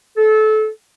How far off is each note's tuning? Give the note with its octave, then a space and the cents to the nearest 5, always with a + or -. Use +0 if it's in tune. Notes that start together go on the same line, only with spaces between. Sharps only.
A4 -25